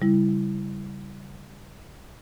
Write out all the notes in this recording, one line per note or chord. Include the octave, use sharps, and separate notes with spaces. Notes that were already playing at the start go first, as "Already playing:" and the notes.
C#3 G3 E4